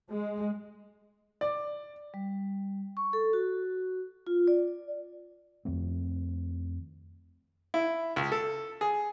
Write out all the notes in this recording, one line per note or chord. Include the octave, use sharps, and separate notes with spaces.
G#3
D5
G3
C#6
A4
F#4
F4
D5
F2 D#3 A3 C4
E4
C#2
A4
G#4